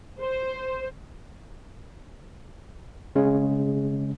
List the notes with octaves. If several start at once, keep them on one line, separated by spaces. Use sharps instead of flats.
C5
C#3 G#3 C#4